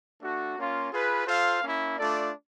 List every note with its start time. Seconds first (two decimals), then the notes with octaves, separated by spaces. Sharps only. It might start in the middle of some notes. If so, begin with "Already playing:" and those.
0.22 A3 D4 F#4
0.57 A#3 C#4 F4
0.92 F4 G#4 B4
1.26 F4 A4 C5 F5
1.62 A#3 C#4 E4
1.97 A3 D4 F4 A4 D5